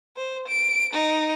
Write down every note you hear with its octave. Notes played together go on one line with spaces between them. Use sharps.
C5
D7
D#4